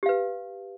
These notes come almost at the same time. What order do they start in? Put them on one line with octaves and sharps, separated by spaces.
G4 F5 B4